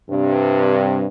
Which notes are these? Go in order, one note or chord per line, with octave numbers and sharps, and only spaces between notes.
G2 C3